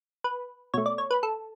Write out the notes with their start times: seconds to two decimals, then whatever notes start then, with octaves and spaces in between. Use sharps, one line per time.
0.24 B4
0.74 B2 A3 C#5
0.86 D5
0.98 C#5
1.11 B4
1.23 A4